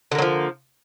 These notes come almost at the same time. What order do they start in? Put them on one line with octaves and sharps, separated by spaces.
D3 A#3 F#3 F3